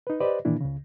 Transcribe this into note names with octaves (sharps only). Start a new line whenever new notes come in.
D#4 B4
G4 B4 C5 D5 D#5
A#2 D#3 E3 A#3 D4 E4
C#2 C#3